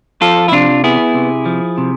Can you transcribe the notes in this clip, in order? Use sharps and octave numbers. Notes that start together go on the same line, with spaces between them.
F3 F4 A4
E4
C3 D4 F4
B3 E4 G#4
C3
F3
C3